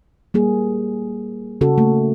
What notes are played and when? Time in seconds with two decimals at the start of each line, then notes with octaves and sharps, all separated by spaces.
0.34 G3 A#3 G#4
1.61 C#3 C#4 F#4 A4
1.78 A3 A#3